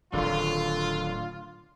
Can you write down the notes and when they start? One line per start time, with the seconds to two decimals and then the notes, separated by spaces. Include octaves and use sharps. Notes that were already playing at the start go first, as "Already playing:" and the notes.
0.13 D1 D3 D#3 F#3 F4